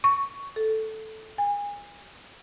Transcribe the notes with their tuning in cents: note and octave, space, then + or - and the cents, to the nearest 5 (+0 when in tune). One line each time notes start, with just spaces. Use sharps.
C#6 +10
A4 -5
G#5 -30